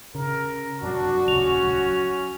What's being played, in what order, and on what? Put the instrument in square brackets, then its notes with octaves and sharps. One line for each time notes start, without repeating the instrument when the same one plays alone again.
[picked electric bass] C#3 [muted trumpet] A#4
[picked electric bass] F#2 C3 F#3 [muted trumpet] D4 [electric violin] F#4
[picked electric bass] D#1 C#2 [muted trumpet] C#4 [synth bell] F7
[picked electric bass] F#3